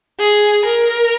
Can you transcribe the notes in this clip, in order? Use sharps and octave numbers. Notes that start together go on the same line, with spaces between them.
G#4
A#4